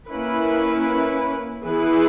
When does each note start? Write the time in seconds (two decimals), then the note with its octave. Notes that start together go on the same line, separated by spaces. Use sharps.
0.11 A#3 C#4 E4 B4
1.63 E3 B3 E4 G#4 B4